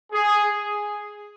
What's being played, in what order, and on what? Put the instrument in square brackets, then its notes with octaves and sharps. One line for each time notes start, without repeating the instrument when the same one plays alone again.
[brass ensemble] G#4